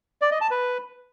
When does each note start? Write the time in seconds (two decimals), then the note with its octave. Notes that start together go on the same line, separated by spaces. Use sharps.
0.21 D5
0.31 D#5
0.41 A5
0.51 B4